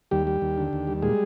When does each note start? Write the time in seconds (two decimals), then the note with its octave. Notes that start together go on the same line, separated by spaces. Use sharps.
0.11 D#2 G3 G4
0.27 G3
0.42 D#2
0.58 D3
0.73 D#2
0.87 G3
1.03 A#2 G#3 G#4